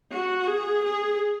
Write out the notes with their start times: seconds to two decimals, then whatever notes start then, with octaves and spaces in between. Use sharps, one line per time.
0.12 F#4
0.47 G#4
0.84 G#4